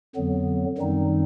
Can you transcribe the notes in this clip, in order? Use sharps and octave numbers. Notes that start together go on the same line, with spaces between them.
F2 D3 F#3 B3
F#2 D#3 G3 C4 D#4